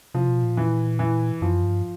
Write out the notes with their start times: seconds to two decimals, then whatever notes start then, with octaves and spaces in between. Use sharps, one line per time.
0.14 C3 F3
0.28 B2
0.43 A#2
0.57 E3
0.99 E3
1.41 F#2 F3
1.63 G2